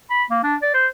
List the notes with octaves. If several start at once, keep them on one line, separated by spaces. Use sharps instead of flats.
B5
A#3
D4
D5
C5